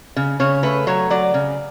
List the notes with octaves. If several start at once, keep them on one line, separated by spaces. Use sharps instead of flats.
C#3
C#3 C#5
A3 B4
F#3 C#5
F#3 D5
C#3